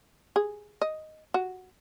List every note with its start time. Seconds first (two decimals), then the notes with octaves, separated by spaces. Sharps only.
0.36 G#4
0.81 D#5
1.34 F#4